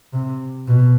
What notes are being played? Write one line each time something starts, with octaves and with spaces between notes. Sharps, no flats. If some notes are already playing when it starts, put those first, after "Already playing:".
C3
B2